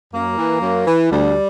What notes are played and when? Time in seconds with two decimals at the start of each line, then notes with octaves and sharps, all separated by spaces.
0.13 F#2 A#3
0.37 E3
0.62 F#2
0.87 E3
1.11 D2 G3